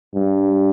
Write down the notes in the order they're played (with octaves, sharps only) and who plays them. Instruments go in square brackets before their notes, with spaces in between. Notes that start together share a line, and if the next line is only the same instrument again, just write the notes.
[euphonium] G2